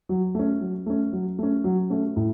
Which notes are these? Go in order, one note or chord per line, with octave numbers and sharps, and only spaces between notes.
F#3
A3 C#4
F#3
A3 C#4
F#3
A3 C#4
F#3
A3 C#4
A2